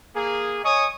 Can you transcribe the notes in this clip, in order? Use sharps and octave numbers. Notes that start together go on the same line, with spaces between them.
A#3 G#4
C#5 D#5 G#5 C#6 D#6